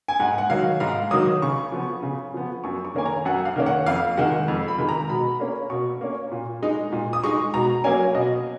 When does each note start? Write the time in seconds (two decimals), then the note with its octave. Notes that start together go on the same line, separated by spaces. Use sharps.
0.08 G#5
0.20 G#2 F#5
0.38 F#5
0.50 D#3 F#3 F5
0.80 G#2 F5
1.11 D#3 F#3 D#6
1.42 C#3 C#6
1.72 F3 B3
2.03 C#3
2.34 F3 B3
2.64 F#2 C#6
2.85 C#6
2.95 D#3 A#3 C#4 G#5
3.06 A#5
3.25 F#2 F#5
3.45 F5
3.56 D#3 A#3 C#4
3.66 F#5
3.86 F2 F5
4.17 D#3 G#3 F#5
4.48 F2
4.68 B5
4.78 D#3 G#3
4.89 A#5
5.09 B2 B5
5.40 A#3 C#4
5.70 B2 C#6
6.01 A#3 C#4
6.31 A#2
6.62 G#3 D#4
6.92 A#2
7.13 D#6
7.24 G#3 D#4 C#6
7.54 B2 A#5
7.84 F#3 A#3 C#4 G#5
8.15 B2 D#5